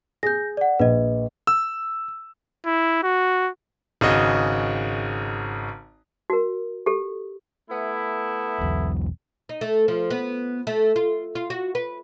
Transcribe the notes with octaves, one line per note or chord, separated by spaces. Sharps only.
G#4 G6 A#6
D5 F#5
A#1 B4 D#5
E6
E4
F#4
G#1 C#3 F#4 D#5
F#4 A#4
G4 A4
A3 B3 E4
E1 B1 E2
D#4
A3
F3
B3
A3
F4
F4
F#4
B4